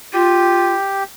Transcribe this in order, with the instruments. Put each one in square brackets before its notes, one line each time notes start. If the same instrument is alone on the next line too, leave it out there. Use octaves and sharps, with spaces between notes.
[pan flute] F4 [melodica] G4